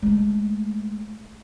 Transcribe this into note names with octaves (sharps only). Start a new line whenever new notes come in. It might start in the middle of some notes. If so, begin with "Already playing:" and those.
G#3 A3